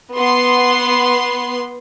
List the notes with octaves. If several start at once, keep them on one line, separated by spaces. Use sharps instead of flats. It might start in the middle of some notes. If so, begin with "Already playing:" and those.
B3 C6